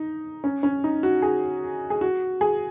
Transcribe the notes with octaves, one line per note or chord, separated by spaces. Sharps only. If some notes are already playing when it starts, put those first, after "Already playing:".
Already playing: D#4
C#4
C#4
D#4
F#4
G#4
G#4
F#4
G#4